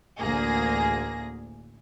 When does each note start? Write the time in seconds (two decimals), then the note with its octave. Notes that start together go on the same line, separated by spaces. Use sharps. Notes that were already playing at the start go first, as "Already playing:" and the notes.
0.19 A1 D2 A#3 G#4 A#6